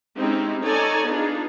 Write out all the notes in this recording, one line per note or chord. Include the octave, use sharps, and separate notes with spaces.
G#3 C4 C#4 D#4 E4 G4
D#4 A4 C#5 D5 G#5 A#5
B3 D4 D#4 F4 G#4